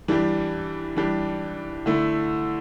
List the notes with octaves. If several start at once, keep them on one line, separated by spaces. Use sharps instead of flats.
E3 G3 D4 G4
E3 G3 D4 G4
D3 A3 E4